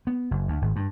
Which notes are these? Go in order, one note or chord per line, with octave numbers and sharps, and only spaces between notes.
B3
F#1
D2
G#1
G2